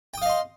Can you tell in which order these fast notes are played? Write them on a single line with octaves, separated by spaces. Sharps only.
G5 D#6 F5 D#5 C6